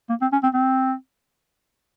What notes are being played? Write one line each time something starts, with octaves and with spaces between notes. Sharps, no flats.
A#3
C4
C#4
C4
C4